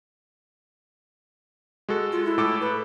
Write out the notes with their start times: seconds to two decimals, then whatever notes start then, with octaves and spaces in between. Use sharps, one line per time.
1.89 G#3 F#4 A4
2.12 F4
2.25 E4
2.38 A2 A4 D6
2.61 B4